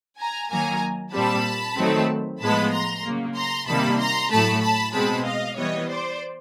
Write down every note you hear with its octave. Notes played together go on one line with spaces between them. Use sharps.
G#5 A#5
D#3 F#3 A#3 G#5 A#5
A#2 G3 C4 A5 B5
D#3 F#3 A3 C4
A2 F3 G#3 B3 A5 B5
A#5 C6
C#3 F#3 A#3
A#5 C6
C3 D#3 G3 A#3 A5 B5
A#5 C6
A2 F#3 A3 A5 B5
A5 B5
B2 G#3 C4 A5 B5
D#5 F5
E3 G3 B3 C#5 D#5
C5 D5